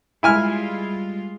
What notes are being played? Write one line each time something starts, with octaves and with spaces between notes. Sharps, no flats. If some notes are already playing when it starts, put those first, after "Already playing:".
G3 G#3 E4 F4 G#5 F6